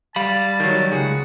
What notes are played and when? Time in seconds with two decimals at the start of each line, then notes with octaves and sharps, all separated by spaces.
0.16 G3 F5 A5 B5
0.60 D#3 F#3
0.92 C#2 G#4 F#5